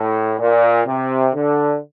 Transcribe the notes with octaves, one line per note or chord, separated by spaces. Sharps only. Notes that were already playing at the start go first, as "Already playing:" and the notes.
Already playing: A2
A#2
C3
D3